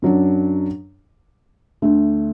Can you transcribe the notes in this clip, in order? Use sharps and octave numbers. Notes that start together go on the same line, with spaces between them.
F#2 F#3 D4
D2 D3 A3